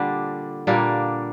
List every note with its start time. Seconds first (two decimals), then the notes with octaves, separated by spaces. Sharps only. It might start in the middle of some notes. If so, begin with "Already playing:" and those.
Already playing: A#2 D3 G3 D4
0.67 A#2 G3 A#3 D4